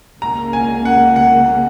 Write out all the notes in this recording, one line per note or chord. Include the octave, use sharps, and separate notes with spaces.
C#2 C#3 A#3 A#5
G#5
F#5
F#5